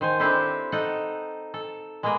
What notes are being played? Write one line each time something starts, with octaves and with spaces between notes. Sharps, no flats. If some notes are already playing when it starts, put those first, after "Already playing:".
D#3 C5 G#5
C4 D4 E4 G4 A4 C5
D#4 A4 F#5
A4
G#3 A#3 B3 G#4 A#4